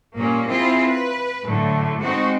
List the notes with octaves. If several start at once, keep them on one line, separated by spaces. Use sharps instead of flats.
A#2 G3 A#3 C#4
C4 E4 F4 G#4
B4
A2 D3 F#3 A3
G#3 C4 D#4 F#4